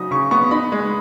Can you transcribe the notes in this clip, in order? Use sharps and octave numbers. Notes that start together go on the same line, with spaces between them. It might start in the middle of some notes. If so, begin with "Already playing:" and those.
Already playing: C#3 F#3 D#4 D#6
C#3 C#6
B3 C#6
D#4 B5
G#3